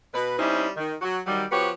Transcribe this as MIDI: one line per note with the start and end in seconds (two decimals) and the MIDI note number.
0.14 0.37 47
0.14 0.37 71
0.39 0.68 55
0.39 0.68 60
0.39 0.68 61
0.39 0.68 63
0.39 0.68 64
0.77 0.94 51
1.02 1.20 54
1.02 1.20 66
1.27 1.44 51
1.27 1.44 54
1.27 1.44 55
1.52 1.70 53
1.52 1.70 59
1.52 1.70 66
1.52 1.70 67
1.52 1.70 73